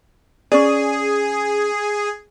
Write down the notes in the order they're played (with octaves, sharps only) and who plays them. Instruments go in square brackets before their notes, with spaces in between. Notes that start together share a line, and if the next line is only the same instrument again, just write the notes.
[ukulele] C#4 D5 [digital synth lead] G#4